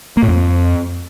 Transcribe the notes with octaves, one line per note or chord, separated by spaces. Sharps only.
A#3
A2
F2